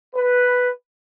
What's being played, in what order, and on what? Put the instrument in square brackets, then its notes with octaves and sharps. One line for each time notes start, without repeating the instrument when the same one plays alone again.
[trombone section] B4